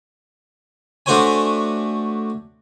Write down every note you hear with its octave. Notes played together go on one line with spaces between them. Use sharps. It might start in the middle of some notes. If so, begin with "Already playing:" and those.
A3 D4 F#4 C5 C#5 G#5